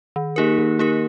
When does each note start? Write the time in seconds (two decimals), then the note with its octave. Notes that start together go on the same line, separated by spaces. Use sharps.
0.16 D#3
0.36 A#3 D#4 G4 A#4
0.58 D#3
0.79 A#3 D#4 G4 A#4